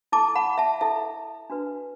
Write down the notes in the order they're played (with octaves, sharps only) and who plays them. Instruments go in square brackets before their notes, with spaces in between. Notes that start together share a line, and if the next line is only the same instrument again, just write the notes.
[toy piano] E4 A4 A5 D6
F#5 B5
E5 A5
E4 A4 E5
D4 F#4 B4